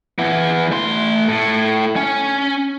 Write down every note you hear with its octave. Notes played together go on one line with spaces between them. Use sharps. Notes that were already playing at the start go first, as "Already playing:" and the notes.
E3 B3
A3 C6
A2
C#4